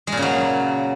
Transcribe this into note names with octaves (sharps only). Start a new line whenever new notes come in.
G#3
A#2
C#3
F#3